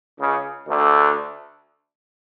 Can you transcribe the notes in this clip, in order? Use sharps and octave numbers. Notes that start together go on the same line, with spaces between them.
C#2 C#3
D2 D3